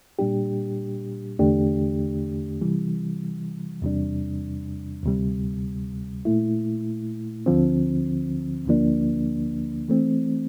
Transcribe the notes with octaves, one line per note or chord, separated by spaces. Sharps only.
A#2 G3 D4 G4
E2 D3 A3 D4 G4
C3 E3 G3
E2 C3 G3 D4
D2 C3 G3
A#2 A3 E4
D2 D3 F3 C4
D2 D3 F3 A#3 D4
E3 A3 C4